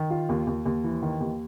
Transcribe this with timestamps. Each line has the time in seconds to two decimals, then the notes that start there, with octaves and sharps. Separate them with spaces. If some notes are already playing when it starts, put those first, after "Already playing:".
Already playing: D#3
0.10 F4
0.29 D#2
0.47 D#2
0.66 D#2
0.84 E3
1.03 D#3
1.20 D#2